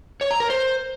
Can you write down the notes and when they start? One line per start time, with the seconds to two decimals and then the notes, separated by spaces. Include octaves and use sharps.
0.21 C#5
0.31 A#5
0.40 A#4
0.50 C5